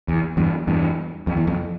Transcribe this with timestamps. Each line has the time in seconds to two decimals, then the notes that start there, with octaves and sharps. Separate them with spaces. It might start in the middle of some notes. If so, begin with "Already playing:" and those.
0.08 E2
0.37 E2 G2
0.67 E2 G2
1.27 F2
1.37 E2
1.47 F2